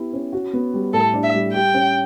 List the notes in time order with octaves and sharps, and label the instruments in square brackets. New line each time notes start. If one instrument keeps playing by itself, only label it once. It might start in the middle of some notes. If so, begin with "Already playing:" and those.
Already playing: [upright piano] B3 E4 G4
C#4
F#4
B3
G3
[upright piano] A2 [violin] A4
[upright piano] D4
[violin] E5
[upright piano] G3
[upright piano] G4 [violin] G5
[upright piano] C#4